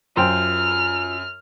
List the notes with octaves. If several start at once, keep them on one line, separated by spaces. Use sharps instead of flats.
F#2 F4 C5 G5 F6